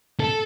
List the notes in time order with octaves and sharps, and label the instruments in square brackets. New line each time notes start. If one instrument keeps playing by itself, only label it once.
[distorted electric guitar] A4